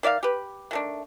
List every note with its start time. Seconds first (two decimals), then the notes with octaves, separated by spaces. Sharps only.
0.03 D#3 D5 E5 F5
0.23 G4 B4
0.71 D#3 A3 D4